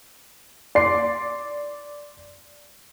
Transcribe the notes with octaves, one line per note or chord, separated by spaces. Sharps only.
D5 C6 C7